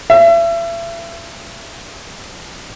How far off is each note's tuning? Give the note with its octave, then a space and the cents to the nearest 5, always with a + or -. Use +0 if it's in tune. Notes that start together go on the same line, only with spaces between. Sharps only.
E5 +35